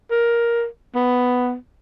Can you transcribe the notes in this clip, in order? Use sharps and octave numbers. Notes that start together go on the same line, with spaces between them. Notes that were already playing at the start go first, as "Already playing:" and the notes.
A#4
B3